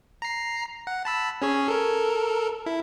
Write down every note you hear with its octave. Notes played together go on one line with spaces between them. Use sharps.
A#5 C7
F#5
A5 B5 E6
C#4 G#4 C#5
A4 A#4
E4